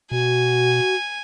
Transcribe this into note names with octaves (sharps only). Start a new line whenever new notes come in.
B2 F#4 G#5